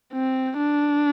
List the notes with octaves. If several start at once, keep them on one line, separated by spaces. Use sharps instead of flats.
C4
D4